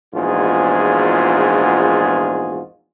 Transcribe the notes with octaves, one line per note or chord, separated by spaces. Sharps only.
A#1 E2 G#2 F4 F#4 G#4